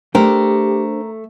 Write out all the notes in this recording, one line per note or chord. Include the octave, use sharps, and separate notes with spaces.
A3 D4 G4 A#4 C5 G5